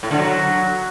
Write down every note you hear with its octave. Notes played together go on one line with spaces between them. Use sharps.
A2
D3
F#3